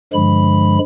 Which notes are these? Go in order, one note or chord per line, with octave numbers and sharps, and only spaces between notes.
G2 D3 F3 G#3 B5